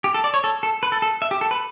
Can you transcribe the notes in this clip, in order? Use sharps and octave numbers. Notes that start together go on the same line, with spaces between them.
G4
A4
D5
C#5
A4
A4
B4
A4
A4
E5
G4
A4
B4